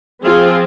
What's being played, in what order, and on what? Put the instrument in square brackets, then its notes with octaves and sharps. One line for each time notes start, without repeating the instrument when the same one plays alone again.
[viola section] F3 C4 F4 G#4